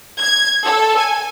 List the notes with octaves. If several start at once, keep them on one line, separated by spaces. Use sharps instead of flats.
G#6
A4
G#5